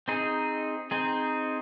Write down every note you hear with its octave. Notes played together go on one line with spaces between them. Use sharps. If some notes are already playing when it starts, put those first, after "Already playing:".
C4 D#4 G#4
C4 D#4 G#4